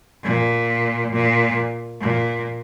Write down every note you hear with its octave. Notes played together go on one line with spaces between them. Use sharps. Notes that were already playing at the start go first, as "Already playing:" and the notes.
A#2
A#2
A#2